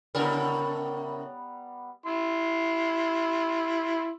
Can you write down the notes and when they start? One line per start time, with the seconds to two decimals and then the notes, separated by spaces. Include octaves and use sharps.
0.15 A2 C#3 G3 B3 A#4 A#5
2.06 E4 C6